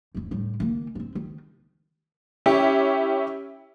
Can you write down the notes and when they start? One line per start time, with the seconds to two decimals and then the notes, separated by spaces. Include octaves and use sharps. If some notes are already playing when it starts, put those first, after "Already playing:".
0.14 D#1 E2
0.31 A2 G3
0.60 D#3 A#3
0.95 C4 D4
1.15 D#3
2.46 C#4 E4 G4 C#5